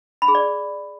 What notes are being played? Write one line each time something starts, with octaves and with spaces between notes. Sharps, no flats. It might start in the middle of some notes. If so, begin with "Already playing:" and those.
B5
G#4
D5